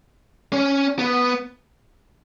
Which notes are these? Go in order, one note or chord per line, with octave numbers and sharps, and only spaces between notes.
C#4
B3